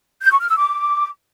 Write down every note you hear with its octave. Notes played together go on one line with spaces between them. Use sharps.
G6
C#6
F6
E6
D6